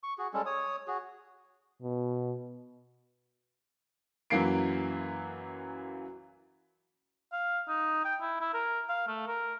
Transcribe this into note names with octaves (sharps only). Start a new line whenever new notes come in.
C#6
F#4 G#4
G3 G#3 C#4 A4
C#5 D#6
F#4 G#4
B2
F#2 E3 F#3 A#3 C7 D7
F5
D#4
G5
E4
E4
A#4
F5
A3
A#4